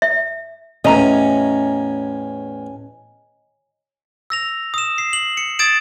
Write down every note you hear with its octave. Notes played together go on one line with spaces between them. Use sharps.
E5
E2 A2 C#4 D#5 A#5
E6 A#6 F7
D#6 E7
C7
F#7
C#7
D#6 G#6 A6 D7 E7